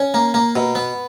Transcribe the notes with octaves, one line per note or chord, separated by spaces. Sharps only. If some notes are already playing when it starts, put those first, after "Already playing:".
Already playing: C#4
A#3
A#3
B2
B3